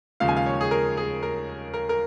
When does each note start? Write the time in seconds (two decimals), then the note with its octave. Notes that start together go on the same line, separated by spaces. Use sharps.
0.20 D#2 C#3 F3 G#3 F5
0.28 G#5
0.36 F5
0.46 C#5
0.61 G#4
0.71 A#4
0.97 G#4
1.23 A#4
1.74 A#4
1.89 A#4